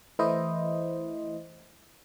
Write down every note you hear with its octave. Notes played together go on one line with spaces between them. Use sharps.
E3 A3 E4 C5 D#5